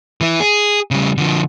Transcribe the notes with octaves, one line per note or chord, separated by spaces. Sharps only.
E3 E4
G#4
C#3 G3
D3 F3